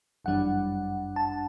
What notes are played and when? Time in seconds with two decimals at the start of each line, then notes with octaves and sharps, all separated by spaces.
0.24 G1 F#2 E3 G3 D4 F#5
1.16 A5